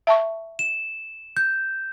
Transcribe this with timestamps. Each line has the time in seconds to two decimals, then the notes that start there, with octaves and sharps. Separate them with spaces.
0.07 E5 A5 C#6
0.59 E7
1.37 G6